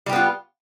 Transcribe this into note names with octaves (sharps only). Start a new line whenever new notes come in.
G3 B3 F4 G4